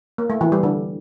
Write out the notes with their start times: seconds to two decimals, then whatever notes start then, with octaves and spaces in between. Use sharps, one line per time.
0.18 A#3
0.30 A3
0.41 E3
0.52 G3
0.63 D3